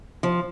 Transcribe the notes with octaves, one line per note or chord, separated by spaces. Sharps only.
F3